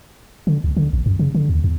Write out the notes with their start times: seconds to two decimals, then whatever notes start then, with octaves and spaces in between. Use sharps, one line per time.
0.47 D3
0.64 C#2
0.77 D3
0.93 A#1
1.06 F#2
1.19 C#3
1.35 D3
1.49 D#2
1.64 E2